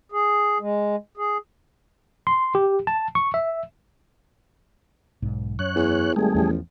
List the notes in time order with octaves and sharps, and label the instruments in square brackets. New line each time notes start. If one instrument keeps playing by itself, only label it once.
[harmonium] G#4
G#3
G#4
[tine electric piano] C6
G4
A5
C#6
E5
[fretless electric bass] B1 G#2
[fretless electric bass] F#2 [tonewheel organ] C#5 F#6
[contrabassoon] E2
[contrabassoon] G#1 [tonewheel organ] G3 A3 G#4
[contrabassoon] A1 [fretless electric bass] E2 F3